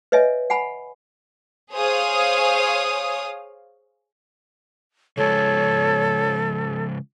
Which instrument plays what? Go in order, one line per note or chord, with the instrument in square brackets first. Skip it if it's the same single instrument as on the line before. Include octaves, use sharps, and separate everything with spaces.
[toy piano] B4 C#5 D#5 E5 G#5
F#5 G#5 B5
[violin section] G#4 C5 C#5 F5 D#6
[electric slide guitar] C#3 F3 G#3 [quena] A4 [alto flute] C#5